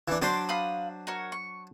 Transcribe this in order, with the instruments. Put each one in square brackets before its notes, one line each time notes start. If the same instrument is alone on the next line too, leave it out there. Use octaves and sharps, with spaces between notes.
[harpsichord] E3 D4
[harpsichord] F#3 D4 C5 [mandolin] A5 C6 D6
[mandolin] F5 B5 D#6
F#4 A#4 C#5
C#6